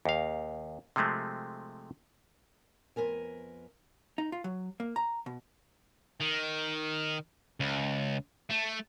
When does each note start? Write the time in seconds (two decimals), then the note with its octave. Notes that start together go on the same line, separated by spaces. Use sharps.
0.05 D#2 F5
0.96 C3 F3 G#3 A3 C4
2.96 F2 B2 B3 A#4 G#5
4.18 D#4
4.32 F4
4.44 F#3
4.80 A#3
4.96 A#5
5.26 B2
6.21 D#3
7.60 C#2
8.50 A3